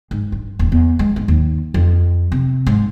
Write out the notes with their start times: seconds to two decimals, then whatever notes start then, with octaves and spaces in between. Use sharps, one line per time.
0.11 G#2
0.32 G2
0.59 D#1
0.72 E2
0.99 G#3
1.16 G#2
1.28 D#2
1.74 F2
2.32 C3
2.66 G#2